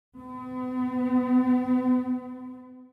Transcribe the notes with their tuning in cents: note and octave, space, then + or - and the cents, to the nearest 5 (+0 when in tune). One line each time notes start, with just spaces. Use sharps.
B3 +45